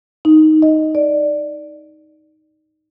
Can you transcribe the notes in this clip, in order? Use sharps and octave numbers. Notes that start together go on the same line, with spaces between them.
D#4
D#5
D5